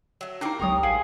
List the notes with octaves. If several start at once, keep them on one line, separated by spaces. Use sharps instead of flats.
F#3 A3
A#3 C4 D4 D#4 G4 A#4
G1 C#2 F#3 A#5 C#6 D#6
A1 G#4 C5 F5 G5 G#5